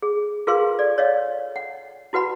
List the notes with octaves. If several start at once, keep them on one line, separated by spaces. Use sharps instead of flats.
G#4
F4 G#4 A#4 B4 F5 C6
A4 D5
C#5 D#5 F5
F#5
E4 F#4 B4 F#5 B5